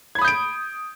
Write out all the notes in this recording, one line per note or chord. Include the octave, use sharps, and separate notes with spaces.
B5 D#6 G6 G#6 D7